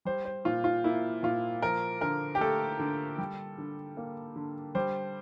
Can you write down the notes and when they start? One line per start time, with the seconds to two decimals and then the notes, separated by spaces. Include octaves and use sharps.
0.05 G3 C5
0.25 C5
0.45 A#2 F4
0.64 F4
0.84 A#3 E4
1.23 A#2 F4
1.62 F3 A#4
2.01 D3 A#4
2.35 G4
2.41 A3 A4
2.79 D3
3.18 G3
3.58 D3
3.97 A#3
4.36 D3
4.75 G3 C5